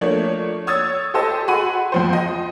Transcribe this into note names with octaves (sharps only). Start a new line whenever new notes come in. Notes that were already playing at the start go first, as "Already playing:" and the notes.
F3 A3 A#3 D4 C#5
C#5 D#6 E6 G#6 A6
G4 A4 C5 D#5 A5 E6
F#4 G#4 B5 C6 D#7
F2 F3 C5
D#5